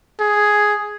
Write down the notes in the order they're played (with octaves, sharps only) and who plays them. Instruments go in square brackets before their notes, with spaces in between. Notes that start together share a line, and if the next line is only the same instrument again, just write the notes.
[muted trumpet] G#4